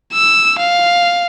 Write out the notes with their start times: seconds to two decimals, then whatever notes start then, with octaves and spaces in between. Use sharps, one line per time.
0.13 E6
0.59 F5